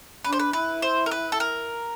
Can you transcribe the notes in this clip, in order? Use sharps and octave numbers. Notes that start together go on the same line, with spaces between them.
D4 B4
C5
B4
E4 B4
C5
A#4
B4
A4
A#4